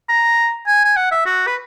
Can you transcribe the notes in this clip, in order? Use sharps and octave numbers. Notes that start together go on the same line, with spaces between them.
A#5
G#5
G#5
F#5
E5
F#4
B4